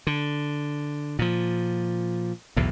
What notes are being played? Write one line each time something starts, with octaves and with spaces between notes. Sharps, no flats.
D3
A#2 F3
B1 E2 A2